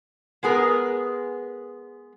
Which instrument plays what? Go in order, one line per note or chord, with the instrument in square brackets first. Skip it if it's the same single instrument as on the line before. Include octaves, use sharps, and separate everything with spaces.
[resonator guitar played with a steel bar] G#3 B3 G#4 A#4